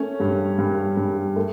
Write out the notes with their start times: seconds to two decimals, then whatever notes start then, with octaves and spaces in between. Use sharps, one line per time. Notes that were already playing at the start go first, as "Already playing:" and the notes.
Already playing: A3 C#4 C#5
0.20 G2
0.58 G2
0.97 G2
1.36 A3